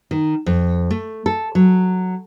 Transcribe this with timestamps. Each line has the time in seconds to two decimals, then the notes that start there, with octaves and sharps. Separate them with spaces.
0.11 D#3
0.46 F2
0.91 A3
1.26 A4
1.55 F#3